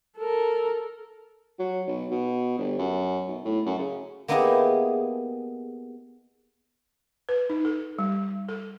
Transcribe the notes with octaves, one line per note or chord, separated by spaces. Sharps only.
A4 A#4
F#3
B1
B2
G1
F#2
B1
A2
F#2
C#3
A#3 B3 D#4 E4 G4 G#4
B4
D#4
A4
G3
A4